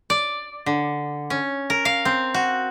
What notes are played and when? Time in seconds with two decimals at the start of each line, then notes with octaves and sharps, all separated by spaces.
0.10 D5
0.66 D3
1.30 C#4
1.70 A#4
1.85 F5
2.05 C4
2.34 F#4